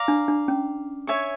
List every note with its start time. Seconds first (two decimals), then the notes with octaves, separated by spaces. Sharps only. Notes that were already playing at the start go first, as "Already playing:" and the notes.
Already playing: D5 F5 A#5
0.08 D4
0.28 D4
0.48 C#4
1.07 C#5 E5 G#5 C#6